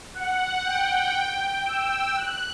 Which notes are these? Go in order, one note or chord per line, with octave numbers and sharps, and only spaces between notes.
F#5
G5
E6
F#6